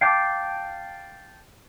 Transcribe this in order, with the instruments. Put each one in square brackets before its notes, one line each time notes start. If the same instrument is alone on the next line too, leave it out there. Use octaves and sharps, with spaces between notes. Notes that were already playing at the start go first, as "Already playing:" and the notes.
[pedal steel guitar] F5 G5 A5 D6